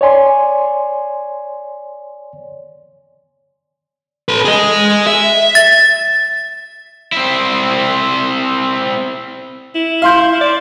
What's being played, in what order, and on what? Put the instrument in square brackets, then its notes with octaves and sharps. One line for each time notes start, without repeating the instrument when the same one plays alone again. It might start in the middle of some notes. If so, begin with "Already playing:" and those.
[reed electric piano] C#5 D5 G#5 C6
[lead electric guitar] A4 B4
G#4 D#5
E5
[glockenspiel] A6
[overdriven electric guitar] C4 E4
[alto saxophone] E4
[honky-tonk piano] F5 C6 G6
[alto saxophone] D5